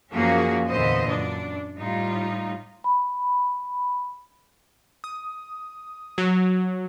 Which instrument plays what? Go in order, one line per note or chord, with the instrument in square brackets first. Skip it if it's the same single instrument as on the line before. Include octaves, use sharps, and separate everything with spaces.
[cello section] F#2 F3 A#3 C#4 F#4 G#4
E2 A#2 D3 E3 C5 D#5
F#2 D4
A2 G3 D#4 F4
[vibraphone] B5
[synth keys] D#6
F#3